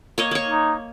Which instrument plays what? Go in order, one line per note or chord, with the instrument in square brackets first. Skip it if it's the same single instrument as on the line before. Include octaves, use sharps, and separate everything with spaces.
[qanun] A#3 C#5 D#5
A#3 C#5
[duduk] D#4